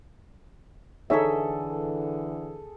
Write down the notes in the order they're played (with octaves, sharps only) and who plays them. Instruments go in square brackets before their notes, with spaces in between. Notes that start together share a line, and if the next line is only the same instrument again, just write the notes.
[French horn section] D3 E3 [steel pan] D#4 C#5 E5 [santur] G#4 A4